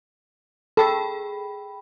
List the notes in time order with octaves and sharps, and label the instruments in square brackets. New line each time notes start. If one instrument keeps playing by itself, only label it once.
[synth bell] G#4 G5 B5 [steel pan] A4